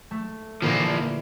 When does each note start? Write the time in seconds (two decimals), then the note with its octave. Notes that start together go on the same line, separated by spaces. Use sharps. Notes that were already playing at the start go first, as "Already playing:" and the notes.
0.11 A3
0.62 A#2 D3 E3 F3 A#3